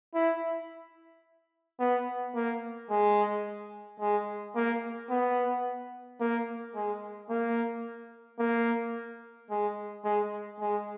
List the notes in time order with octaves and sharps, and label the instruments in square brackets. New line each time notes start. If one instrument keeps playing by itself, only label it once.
[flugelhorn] E4
B3
A#3
G#3
G#3
A#3
B3
A#3
G#3
A#3
A#3
G#3
G#3
G#3